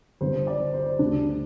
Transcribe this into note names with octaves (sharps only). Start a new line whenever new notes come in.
G1 G2 G3 C5
D5
C5
C5
C5
D2 D3 G3 D4